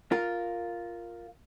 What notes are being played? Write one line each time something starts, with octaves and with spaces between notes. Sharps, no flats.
F4 A#4